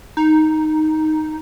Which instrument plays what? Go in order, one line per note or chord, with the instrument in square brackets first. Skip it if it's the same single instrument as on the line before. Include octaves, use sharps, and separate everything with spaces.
[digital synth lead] D#4